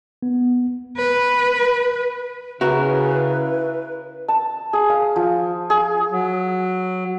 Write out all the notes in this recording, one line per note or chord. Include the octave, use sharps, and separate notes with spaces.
B3
B4
C#3 E4 F#4 A#4 B4
A5
G#4
F5
F3
G#4
F#3